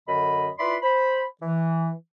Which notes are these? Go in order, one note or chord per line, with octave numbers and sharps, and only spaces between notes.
F#2 D3 D#5 B5
E4 F4 B4 D5 B5 C6
C5 B5
E3